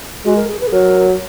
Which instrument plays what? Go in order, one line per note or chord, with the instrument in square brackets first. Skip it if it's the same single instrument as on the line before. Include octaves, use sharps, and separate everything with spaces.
[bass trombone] G#3 [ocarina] F#4
[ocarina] A#4
G#4
B4
G#4
[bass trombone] F#3 [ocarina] A#4